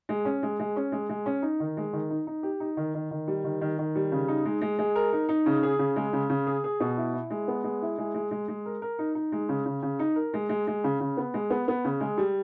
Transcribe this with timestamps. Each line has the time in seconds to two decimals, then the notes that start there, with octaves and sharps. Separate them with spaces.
0.09 G#3
0.25 C#4
0.43 G#3
0.59 G#3
0.76 C#4
0.92 G#3
1.09 G#3
1.26 C#4
1.42 D#4
1.60 D#3
1.77 G#3
1.93 D#3
2.10 D#4
2.27 D#4
2.43 G4
2.60 D#4
2.77 D#3
2.94 D#3
3.11 D#3
3.28 G3
3.44 D#3
3.61 D#3
3.79 D#3
3.95 G3
4.12 C#3
4.28 D#4
4.45 G#3
4.61 G#3
4.79 G#3
4.95 A#4
5.13 D#4
5.29 D#4
5.46 C#3
5.63 G#4
5.79 C#3
5.96 G#3
6.13 C#3
6.30 C#3
6.47 G#4
6.64 G#4
6.80 B2
6.97 E4
7.14 E4
7.30 G#3
7.48 B3
7.64 G#3
7.82 E4
7.98 G#3
8.14 G#3
8.31 G#3
8.48 G#3
8.66 A#4
8.82 A#4
8.99 D#4
9.15 D#4
9.32 G#3
9.49 C#3
9.66 C#3
9.83 C#3
9.99 D#4
10.16 A#4
10.34 G#3
10.49 G#3
10.67 G#3
10.84 C#3
11.00 C#3
11.17 B3
11.34 G#3
11.50 B3
11.68 B3
11.85 C#3
12.00 G#3
12.18 G3